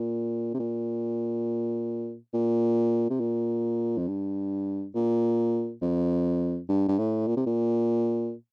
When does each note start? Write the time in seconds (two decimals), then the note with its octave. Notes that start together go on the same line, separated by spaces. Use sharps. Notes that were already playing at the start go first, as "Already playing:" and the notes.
Already playing: A#2
0.54 C3
0.59 A#2
2.34 A#2
3.10 C3
3.20 A#2
3.97 F2
4.08 G2
4.95 A#2
5.82 F2
6.69 G2
6.88 G2
6.99 A2
7.27 A#2
7.36 C3
7.46 A#2